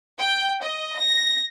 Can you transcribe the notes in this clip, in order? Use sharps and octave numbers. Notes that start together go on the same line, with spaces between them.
G5
D#5
A#6